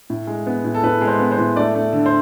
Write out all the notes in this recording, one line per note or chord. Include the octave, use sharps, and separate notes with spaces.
A2
G#3
B3
A2
A4
A2 B4
G#3
C5
B3
C5
A2
A3 D5
A3
D3
C5